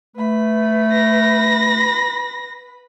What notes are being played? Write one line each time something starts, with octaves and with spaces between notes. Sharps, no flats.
A3 B4 B5
A#6